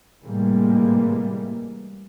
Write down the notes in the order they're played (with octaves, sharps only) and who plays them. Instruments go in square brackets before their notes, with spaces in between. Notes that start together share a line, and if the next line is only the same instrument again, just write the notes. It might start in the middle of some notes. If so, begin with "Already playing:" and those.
[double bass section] A2 C3 E3 G3 G#3 A#3